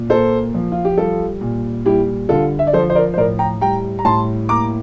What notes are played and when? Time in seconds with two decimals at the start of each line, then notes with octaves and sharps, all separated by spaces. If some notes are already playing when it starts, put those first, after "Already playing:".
Already playing: A#2
0.09 A#3 A4 C5
0.54 F3
0.72 F4
0.85 G4
0.98 G3 F4 A4
1.41 A#2
1.85 G3 E4 G4
2.29 D3 F4 A4
2.59 E5
2.67 D5
2.73 F3 A4 C5
2.90 C5
2.95 A#4 D5
3.14 C5
3.17 A2 A#4 D5
3.39 G5 A#5
3.61 G3 G5 A#5
3.99 A#5
4.05 A2 A5 C6
4.49 A#3 A#5 D6